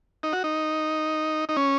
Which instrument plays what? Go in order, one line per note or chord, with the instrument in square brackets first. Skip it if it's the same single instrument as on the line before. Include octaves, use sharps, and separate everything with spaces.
[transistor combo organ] D#4
F#4
D#4
D#4
C#4